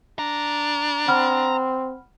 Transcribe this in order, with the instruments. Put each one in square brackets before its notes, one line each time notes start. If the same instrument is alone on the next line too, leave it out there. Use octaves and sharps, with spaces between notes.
[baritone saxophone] D4 [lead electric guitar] A#5
[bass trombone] C4 [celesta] F#5 B5 F6